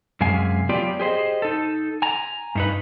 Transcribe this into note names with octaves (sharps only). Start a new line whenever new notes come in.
F#2 C3 G#3 F5 G#5
F#3 B3 F4 G4 D5
G4 G#4 C5 D#5
D#4 A4
G#5 A#5
G2 D#4 B4